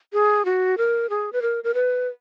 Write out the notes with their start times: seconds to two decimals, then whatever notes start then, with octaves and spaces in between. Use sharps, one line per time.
0.13 G#4
0.45 F#4
0.78 A#4
1.10 G#4
1.33 B4
1.42 A#4
1.64 A#4
1.74 B4